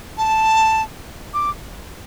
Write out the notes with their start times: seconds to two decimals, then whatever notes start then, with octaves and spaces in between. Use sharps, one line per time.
0.18 A5
1.34 D6